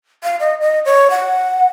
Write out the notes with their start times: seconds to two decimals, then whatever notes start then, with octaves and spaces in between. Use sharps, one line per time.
0.23 F5
0.40 D#5
0.61 D#5
0.85 C#5
1.10 F#5